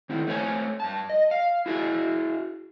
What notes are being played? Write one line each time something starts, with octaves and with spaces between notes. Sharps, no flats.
D#3 C4 E4
A3 C4 C5 C#5 G#5
G2 A5
D#5
F5
E4 F#4 G#4 E5